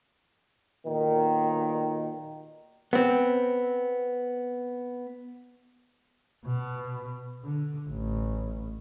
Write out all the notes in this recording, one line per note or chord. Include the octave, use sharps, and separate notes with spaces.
B1 A#2 D#3
B3 C4
B2
D3
A1